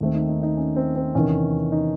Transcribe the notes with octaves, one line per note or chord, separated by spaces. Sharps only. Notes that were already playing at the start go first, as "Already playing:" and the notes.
D#2 D#3 A3 C4
D#4
D#4
D#4
C#4
C4
C4
E2 C3 D#3 C#4
D#4